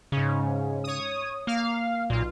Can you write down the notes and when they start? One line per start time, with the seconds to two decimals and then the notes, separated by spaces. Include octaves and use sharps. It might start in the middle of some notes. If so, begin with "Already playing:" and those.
0.12 G#2 C#3 C#4
0.84 C#5 D#6
1.47 A#3 F5
2.10 B1 A#2 F4